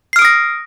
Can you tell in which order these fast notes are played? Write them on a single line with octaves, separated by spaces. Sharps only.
C7 F6 D7 D#6 A#6